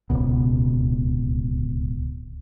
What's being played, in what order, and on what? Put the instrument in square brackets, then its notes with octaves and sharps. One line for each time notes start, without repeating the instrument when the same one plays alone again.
[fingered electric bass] D1 G#1 C#2 B2